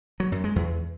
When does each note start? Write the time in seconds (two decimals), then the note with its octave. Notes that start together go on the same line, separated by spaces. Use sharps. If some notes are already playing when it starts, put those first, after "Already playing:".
0.20 F#3
0.32 F#2
0.44 G#3
0.56 E2